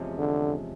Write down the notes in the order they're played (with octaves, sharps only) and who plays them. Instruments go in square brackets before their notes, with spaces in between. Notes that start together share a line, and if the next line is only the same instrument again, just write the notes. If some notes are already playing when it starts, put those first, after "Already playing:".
Already playing: [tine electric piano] E2 C3 F3 G#3 C#4
[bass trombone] D3